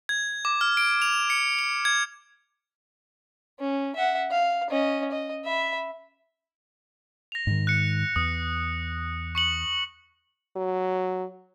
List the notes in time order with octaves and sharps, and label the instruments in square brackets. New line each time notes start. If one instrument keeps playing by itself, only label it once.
[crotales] G#6
D6
F6
D7
F7
C#7
F7
G#6
[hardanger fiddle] C#4
E5 F#5
F5
C#4 D#5
D#5
E5 B5
[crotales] A#6 F7
[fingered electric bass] G#2 D#3
[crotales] F#6 C#7
[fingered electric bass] E2 [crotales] D#6
[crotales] C#6 C#7 F#7
[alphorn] F#3